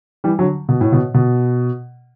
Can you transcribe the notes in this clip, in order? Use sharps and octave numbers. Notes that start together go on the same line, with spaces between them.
E3 G3
D3 F#3
B2
A2
B2
B2